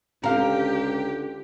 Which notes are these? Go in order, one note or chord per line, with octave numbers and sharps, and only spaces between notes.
C#2 D3 C4 G4 A#4 F5